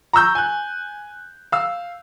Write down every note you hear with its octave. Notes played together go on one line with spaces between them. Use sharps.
A#5 C#6 E6 G6
G#5 F#6
F5 E6